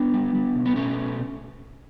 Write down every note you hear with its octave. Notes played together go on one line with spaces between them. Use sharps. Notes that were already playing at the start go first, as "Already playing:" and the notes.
Already playing: B3 D4
G3
G3
B2
B3
B2 A3 C#4